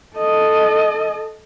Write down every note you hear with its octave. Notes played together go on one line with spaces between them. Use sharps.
A4 D#5